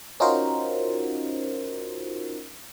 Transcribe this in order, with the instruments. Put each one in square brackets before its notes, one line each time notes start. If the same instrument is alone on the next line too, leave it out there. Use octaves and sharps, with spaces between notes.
[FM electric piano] C#4 D#4 F4 F#4 A#4 C5